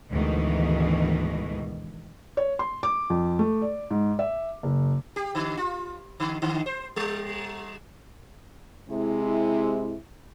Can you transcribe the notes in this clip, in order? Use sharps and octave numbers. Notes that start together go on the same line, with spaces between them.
D2 G#2 B2 D#3 E3
C#5
C6
D6
F2
A3
D5
G#2
E5
F#1
G4
D3
F4
D3
D3
C5
G3
C3 G#3 E4